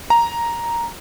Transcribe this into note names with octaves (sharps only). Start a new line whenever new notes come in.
A#5